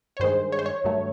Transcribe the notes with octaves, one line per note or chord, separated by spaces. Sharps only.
C#5
G2 D#3 G#3 C5
C#5
C5
C#5
G2 D#3 F#3 A3